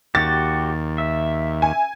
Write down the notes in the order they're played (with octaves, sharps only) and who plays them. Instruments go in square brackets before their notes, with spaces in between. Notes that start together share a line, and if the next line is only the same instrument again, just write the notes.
[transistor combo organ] D#2 [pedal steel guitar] F#4 G4 [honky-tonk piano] A6
[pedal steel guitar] E5
[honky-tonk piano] G#5